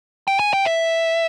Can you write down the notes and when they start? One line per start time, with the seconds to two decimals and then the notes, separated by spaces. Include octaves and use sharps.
0.28 G5
0.39 G#5
0.53 G5
0.65 E5